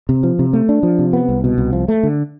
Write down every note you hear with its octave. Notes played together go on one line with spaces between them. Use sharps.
C3
F3
C3
A3
D4
F3
C3
B3
C2
B2
C2
F3
A3
D3